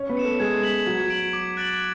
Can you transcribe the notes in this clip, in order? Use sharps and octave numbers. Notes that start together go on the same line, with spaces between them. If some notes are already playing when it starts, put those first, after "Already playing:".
Already playing: C#4 C#5
B3 B4
C#7 E7
A3 A4
G#3 G#4 G#6
B6 F#7
F#3 F#4 G#6
D7 F#7
D6
F#6 A6 D7 F#7